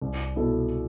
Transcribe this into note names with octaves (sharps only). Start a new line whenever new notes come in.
C2
B2 B3 E4 A4